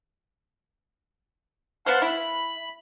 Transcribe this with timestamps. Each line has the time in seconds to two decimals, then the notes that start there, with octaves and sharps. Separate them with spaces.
1.86 B3 C5 F5 F#5 A5
2.02 E4 B5